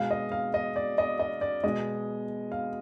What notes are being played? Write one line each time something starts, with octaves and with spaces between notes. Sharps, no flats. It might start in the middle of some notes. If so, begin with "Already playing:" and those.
Already playing: B2 G#3 F5
D#5
F5
D#5
D5
D#5
D#5
D5
B2 G#3 D#5
F5